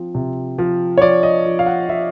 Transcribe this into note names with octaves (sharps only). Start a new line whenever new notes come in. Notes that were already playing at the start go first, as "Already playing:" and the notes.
Already playing: F3 C4
C3
F3
C#5
F3 D5
D#5
F3
F5
F#5
F3 E5